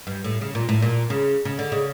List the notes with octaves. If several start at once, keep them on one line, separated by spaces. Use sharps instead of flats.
G2
A2
C#3
A#2
A2
A#2
C#3
C#3
D3
C#3